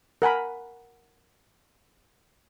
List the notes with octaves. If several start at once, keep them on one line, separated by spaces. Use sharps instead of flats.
A#4 F#5 G#5 B5